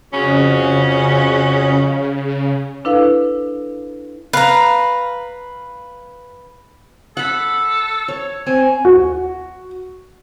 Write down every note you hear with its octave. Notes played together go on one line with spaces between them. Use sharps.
F2 C#3 C#4 F#4 G#4
D4 E4 A4 B4 F5
B4 F5 A#5
A4 F#5 B5
C#5
C4 G#5
F#4